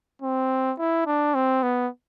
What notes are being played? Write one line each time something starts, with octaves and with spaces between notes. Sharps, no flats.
C4
E4
D4
C4
B3